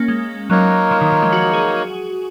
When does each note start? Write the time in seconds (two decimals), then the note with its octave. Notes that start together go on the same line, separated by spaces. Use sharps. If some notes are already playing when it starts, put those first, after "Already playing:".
Already playing: A#3 C#4
0.08 G#3
0.50 F#3 A#3 D#4 A#4 C#5
0.91 F3
1.01 D#3
1.12 F3
1.23 G#3
1.32 F#4
1.54 G#4